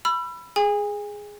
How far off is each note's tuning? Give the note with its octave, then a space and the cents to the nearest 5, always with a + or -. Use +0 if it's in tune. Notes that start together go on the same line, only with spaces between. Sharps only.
B5 +0 E6 +35
G#4 +0 G#5 -35